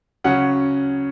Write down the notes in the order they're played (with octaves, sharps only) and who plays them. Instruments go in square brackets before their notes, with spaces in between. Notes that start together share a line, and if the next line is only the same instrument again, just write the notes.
[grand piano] C#3 F#3 C#4 F#5